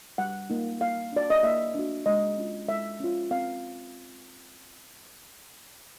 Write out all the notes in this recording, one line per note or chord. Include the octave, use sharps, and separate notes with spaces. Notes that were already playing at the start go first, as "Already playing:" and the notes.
G3 F#5
A#3 D#4
A#3 F5
D4 F#4 D5
D#5
A#3 E5
D4 F#4
G#3 D#5
C#4 F4
G#3 E5
C#4 F4
C4 F5